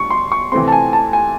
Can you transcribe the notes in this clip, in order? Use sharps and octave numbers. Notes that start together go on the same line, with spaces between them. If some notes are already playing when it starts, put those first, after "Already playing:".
Already playing: G2 C#6
C6
C#6
C3 E3 A3 C4 C6
A5
G#5
A5
G#5